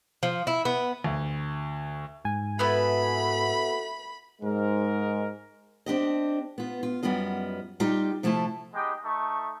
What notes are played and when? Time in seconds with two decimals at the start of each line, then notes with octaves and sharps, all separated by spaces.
0.23 F3
0.47 E4
0.65 B3
1.04 D2
2.25 G#2 G#5
2.59 B3 E4 F#4 A4 B4 E5 B5
4.42 G#2 G#3 A#4
5.86 C4 D4 G4 D#5
6.58 B3 F4
6.83 F4
7.03 F#2 G3 B3 F4 D#5
7.80 G3 D#4 F4 G4
8.23 C3 F3 A3 E4 F4 A5
8.74 G#3 B3 D#4 G4 D#5 G5
9.05 A3 D#4 C#6